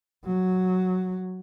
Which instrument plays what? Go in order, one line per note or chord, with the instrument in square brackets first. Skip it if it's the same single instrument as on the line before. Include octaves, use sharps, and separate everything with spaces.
[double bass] F#3